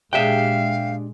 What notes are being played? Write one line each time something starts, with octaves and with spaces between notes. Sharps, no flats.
A#2 G#3 D4 G4 G#4 E5 F5 G5